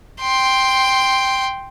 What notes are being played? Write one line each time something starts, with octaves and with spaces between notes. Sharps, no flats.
G5 C6